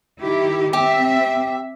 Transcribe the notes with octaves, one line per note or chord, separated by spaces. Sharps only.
D#3 E4 G4
C4 G4 E5